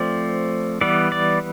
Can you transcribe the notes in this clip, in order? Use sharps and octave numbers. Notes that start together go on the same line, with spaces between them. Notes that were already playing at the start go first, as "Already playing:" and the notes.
Already playing: F3 A3 C4 D5
E3 G3 B3 D5
D5